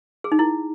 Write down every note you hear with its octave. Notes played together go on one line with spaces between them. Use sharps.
G#4
D#4
E4